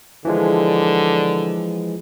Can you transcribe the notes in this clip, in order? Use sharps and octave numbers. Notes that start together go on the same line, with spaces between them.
D3 E3 F3 G#3